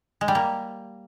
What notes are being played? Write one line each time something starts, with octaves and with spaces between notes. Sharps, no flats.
G#3
G3
A#3